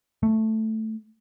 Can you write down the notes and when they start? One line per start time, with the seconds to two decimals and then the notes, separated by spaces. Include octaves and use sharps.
0.23 A3